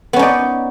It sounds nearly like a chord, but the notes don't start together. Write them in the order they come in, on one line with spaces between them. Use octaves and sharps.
B3 C#4 D#4 D5